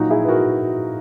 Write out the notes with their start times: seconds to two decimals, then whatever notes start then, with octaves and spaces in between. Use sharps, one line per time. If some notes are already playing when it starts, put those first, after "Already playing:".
Already playing: A#2 F#3 D#4 F#4
0.10 E4 G#4
0.25 B4
0.28 F#4 A#4